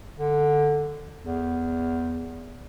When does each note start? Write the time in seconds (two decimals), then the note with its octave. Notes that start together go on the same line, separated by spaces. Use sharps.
0.18 D3
1.22 E2